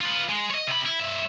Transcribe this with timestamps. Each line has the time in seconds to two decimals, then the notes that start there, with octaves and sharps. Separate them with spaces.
0.01 F4 B4
0.30 G#3
0.51 C#5 D#5
0.68 C3 B5
0.86 E4
1.00 G2 E5